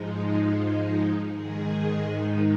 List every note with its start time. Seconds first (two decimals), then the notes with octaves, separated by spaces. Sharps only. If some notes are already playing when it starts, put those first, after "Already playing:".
Already playing: G#2 F3 G#3 D#4
1.32 G#2 D#3 G#3 G#4
2.09 D#4